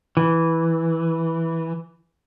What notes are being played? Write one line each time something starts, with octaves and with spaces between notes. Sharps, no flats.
E3